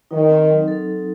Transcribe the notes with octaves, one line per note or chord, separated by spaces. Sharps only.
D#3 D#4
C4
F#3
A4
D#4